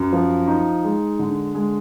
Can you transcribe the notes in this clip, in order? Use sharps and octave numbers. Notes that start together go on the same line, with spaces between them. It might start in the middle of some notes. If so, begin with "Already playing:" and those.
Already playing: F#2
F3
D#4
G#3
D3
G#3